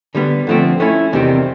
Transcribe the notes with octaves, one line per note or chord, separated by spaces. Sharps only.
D3 G3 B3
D3 F3 A3 C4
A3 C#4 E4
E2 C3 D#3 G3 C4